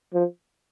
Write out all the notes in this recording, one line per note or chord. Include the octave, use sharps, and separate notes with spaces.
F3